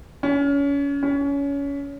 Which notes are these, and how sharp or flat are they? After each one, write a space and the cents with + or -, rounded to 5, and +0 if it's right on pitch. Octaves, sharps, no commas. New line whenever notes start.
C#4 +30
C#4 +25